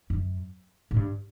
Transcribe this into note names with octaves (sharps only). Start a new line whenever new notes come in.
F#2
A2
G2